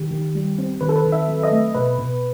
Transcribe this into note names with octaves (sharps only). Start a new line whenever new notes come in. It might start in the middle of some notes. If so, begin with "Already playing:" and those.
Already playing: D#3 G4
D#3
G3
C4
D#3 B4
A4
B4
D#3
E5
F#3
D#5
A3
B2 B4
B2